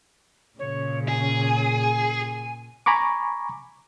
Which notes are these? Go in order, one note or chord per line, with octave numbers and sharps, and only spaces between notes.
A#2 C#3 C#5
G#4 G#5
G#5 A#5 B5 C#6 D6